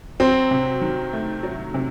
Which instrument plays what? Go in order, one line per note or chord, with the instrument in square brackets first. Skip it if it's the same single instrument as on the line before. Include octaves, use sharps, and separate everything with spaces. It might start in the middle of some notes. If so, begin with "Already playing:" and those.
[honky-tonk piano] F#3 [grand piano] C4
[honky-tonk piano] C3
D#3
A3
F#3
C3